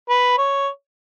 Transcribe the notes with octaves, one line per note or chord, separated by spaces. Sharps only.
B4
C#5